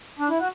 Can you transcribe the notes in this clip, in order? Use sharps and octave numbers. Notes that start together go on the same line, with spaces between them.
D4
E4
F#4